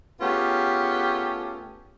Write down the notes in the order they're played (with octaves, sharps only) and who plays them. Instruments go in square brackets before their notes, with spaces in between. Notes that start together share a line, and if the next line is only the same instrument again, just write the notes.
[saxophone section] A3 B3 C#4 F4 G4 G#4